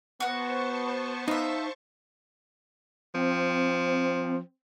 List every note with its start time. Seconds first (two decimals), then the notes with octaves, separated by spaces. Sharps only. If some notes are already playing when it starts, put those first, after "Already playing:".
0.20 B3 F#4 C5 F#5 A5 C#6
1.28 D#4 F4 E5
3.15 F3 C4